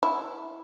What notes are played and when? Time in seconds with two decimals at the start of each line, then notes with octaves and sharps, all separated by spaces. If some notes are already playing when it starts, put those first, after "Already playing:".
0.03 E4